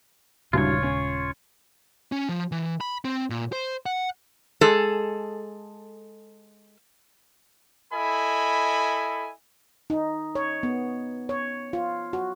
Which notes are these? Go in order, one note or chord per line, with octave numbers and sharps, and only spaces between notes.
D#1 C2 G2 C#3 F#3 G#3 F4 C#5
C#4
C#4
F3
E3
B5
C4
A#2
C5
F#5
G#3 G#4 A4
E4 A4 D#5 G#5 B5
D#4
C#5
B3
C#5
F4
F#4